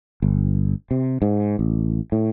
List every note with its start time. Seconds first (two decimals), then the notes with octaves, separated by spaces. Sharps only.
0.22 G1
0.91 C3
1.22 G#2
1.59 A1
2.12 A2